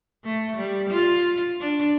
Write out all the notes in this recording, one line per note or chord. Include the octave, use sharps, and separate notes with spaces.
A3
G3
F4
D4